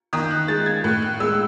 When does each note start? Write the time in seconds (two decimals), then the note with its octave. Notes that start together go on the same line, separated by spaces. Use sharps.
0.13 D#3 D#6
0.31 F#6
0.48 G#3 A6
0.66 G#6
0.84 A2 F#6
1.02 F#6
1.20 G#3 E6